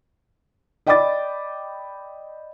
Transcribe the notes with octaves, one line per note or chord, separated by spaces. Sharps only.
D5 D#5 G5 B5 D6 A6